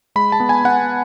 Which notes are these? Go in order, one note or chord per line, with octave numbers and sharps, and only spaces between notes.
G#3 B5
A5
B3
G#5
B3 F#5